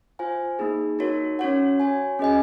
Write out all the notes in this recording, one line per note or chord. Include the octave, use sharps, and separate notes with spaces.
F4 C5 F5 G#5
A#3 D#4 G#4
D#4 F#4 A#4 C#5
C#4 F#4 C#5 F#5
F#4 C#5 G#5
C#4 G#4 D#5 G#5